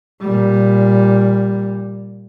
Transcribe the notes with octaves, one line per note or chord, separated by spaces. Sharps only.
A#2 G3